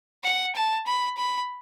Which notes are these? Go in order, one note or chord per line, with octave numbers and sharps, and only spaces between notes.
F#5
A5
B5
B5